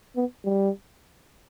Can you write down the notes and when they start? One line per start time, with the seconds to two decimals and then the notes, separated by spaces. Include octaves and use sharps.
0.16 B3
0.44 G3